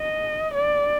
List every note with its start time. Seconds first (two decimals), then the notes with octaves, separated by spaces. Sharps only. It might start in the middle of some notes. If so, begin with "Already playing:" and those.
Already playing: D#5
0.54 D5